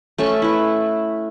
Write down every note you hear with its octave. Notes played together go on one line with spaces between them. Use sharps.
A3 C#4 A4 C#6
E4 B4